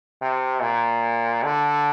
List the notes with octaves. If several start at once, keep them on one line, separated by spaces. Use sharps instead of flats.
C3
A#2
D3